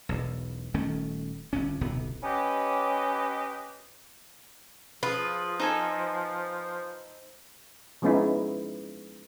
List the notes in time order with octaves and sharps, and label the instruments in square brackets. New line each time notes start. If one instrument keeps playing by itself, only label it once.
[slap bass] E1 B1
D#1 D#3 A3 C#4
G1 G2 C#4
D1 B1 C3 B3
[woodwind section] C#4 G4 B4 D#5
[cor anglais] F3 [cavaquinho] F4 [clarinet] G#4 [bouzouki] B4
[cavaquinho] D#4 A4 G#5 [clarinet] C5
[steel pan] F3 G#3 B3 C#4 D#4 E4